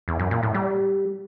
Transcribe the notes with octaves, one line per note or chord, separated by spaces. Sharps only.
E2
F#2
A#2
A2
G3